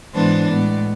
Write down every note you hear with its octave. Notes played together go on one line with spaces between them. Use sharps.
G#2 E3 G#3 B3 D4 C5
A2 G#3 B3 D5